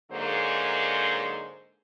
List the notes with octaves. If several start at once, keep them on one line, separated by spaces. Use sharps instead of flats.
G#2 D3 F#3 G#3 A#3 C5